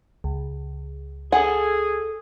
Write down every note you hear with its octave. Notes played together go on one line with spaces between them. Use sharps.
C#2
G#4 A4 F#5 G#5